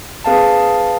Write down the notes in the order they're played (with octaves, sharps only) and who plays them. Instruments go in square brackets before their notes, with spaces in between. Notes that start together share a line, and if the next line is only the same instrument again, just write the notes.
[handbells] C4 G#4 B4 F5 A5